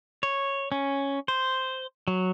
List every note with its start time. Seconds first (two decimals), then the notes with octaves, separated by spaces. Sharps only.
0.23 C#5
0.72 C#4
1.28 C5
2.08 F#3